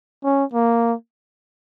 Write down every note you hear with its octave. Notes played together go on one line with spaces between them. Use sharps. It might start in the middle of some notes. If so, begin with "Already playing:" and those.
C#4
A#3